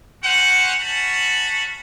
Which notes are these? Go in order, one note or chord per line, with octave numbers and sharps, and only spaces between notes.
C#4 F#4 C5 F#5
C#4 F#4 A5 B5